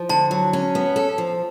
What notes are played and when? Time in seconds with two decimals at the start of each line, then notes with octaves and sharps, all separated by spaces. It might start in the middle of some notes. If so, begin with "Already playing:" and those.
Already playing: F3
0.09 D3 A5
0.31 F#3
0.53 C#4
0.75 B3
0.96 A4
1.18 F3